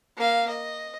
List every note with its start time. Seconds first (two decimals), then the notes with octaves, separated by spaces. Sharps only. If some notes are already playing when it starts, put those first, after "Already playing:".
0.17 A#3 F5
0.48 D#5